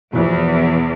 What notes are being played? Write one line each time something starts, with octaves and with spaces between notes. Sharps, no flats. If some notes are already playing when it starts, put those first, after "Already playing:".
E2 B2 E3 F3